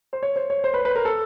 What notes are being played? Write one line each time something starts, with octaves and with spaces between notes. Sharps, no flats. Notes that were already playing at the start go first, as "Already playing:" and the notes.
C5
C#5
C5
C#5
C5
B4
B4
A#4
A4